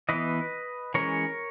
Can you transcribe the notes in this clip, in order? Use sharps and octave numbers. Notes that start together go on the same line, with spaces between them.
E3 B3 B4 D#5
E3 G#3 C#4 A#4 C#5